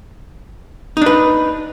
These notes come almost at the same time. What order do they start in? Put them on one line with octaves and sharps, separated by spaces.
D#4 D4 B4